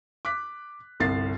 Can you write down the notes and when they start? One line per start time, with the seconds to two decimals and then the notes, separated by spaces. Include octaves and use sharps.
0.25 D6 F#6 B6
1.00 G1 C2 A6 C7